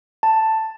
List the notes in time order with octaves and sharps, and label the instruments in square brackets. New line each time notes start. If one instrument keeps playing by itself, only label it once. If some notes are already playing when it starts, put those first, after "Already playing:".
[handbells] A5